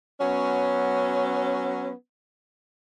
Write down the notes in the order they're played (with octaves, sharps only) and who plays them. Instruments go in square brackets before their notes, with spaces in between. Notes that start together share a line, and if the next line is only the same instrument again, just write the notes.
[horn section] F#3 B3 C#4